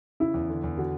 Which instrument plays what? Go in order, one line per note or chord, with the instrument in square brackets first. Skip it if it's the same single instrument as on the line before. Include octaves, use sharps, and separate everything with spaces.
[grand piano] C#3 [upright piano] E4
[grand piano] E2
D3
E2
[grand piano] D3 [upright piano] F#4